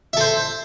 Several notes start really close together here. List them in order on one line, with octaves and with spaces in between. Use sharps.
E5 A4 C5